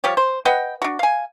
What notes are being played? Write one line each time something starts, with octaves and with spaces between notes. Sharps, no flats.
F3 G3 G4 C#5
C5
B4 D#5 F#5 G5
D4 F#4
F5 G#5